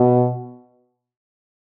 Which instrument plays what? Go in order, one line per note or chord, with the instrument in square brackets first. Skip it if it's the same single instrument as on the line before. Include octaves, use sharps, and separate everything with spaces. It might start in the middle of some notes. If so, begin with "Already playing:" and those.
Already playing: [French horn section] B2